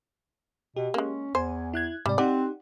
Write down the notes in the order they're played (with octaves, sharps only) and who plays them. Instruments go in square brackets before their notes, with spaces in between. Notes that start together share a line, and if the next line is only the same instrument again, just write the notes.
[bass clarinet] B2 [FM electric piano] G4
[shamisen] G#3 A#3 [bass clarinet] C#4
[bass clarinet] E2 [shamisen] C5 [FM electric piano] G#5
[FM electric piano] E4 F#6 G#6
[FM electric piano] G#2 C3 D5 [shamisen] G3
[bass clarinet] C4 [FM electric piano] D#4 G4 F#5 [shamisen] D5